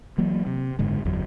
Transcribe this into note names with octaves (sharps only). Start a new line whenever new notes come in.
E3 F#3 A#3
C3
F#1 G#2 D3 G#3
G1 E2 F#3